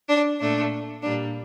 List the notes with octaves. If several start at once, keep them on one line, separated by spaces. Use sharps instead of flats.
D4
A#2 A3 D4
A#2 G3 A#3 D4